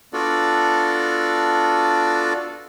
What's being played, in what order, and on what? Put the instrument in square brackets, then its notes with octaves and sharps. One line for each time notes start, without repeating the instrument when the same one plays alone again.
[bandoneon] B3 D4 F4 F#4 A4 D5